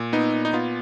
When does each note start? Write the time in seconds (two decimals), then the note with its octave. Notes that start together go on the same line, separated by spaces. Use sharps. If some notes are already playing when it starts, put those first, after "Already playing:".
Already playing: A#2
0.13 B3 D#4
0.33 A#2
0.45 D#4
0.53 B3 F4